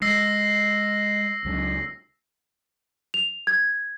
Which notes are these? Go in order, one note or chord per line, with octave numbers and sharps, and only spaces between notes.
G#3 E6 A#6 C7
C#2 F#3
F7
G#6